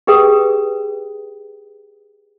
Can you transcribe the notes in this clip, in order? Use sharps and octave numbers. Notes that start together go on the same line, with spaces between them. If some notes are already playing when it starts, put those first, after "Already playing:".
G4 G#4 B4 G5 D#6